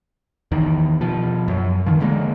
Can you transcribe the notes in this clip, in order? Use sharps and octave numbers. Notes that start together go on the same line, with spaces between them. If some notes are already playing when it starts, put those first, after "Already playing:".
E2 D#3
B2 F3
F#2
D#3 F3
D3 G#3 A#3